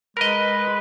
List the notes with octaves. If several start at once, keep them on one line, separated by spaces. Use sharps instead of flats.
G#3 A#4 B4 D#5